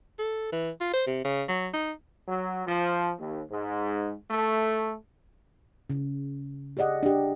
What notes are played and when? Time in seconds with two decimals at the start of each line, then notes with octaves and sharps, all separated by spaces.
0.19 A4
0.52 E3
0.81 F4
0.94 C5
1.07 C3
1.25 C#3
1.49 F#3
1.73 D#4
2.27 F#3
2.67 F3
3.19 D#2
3.50 G#2
4.30 A3
5.90 C#3
6.77 G4 G#4 D5 D#5 F#5
7.03 D4 G4